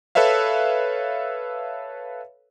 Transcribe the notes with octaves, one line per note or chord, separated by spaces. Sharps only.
A4 B4 C#5 E5 F5